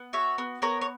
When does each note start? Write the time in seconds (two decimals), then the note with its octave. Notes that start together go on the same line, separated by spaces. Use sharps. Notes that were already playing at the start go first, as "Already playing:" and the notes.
Already playing: B3
0.13 F#4 C#5 E5
0.38 B3
0.62 B3 A#4 C#5
0.81 C#5